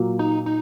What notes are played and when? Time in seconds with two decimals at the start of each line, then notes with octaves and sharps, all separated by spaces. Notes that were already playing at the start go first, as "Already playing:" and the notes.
Already playing: A#2 F#3 A#3
0.19 D#4
0.46 D#4